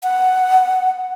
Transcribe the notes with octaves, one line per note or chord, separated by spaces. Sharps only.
F#5